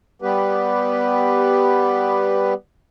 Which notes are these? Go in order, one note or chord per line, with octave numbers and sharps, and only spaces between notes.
G3 B3 G4 B4